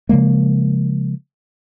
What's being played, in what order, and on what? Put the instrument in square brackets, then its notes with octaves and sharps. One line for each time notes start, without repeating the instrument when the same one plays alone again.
[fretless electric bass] C#3 F3 G#3 A#3